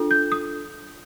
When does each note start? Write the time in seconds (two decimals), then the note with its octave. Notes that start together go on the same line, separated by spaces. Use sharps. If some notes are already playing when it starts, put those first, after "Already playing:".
Already playing: D4 F4 A4
0.11 G6
0.32 D#6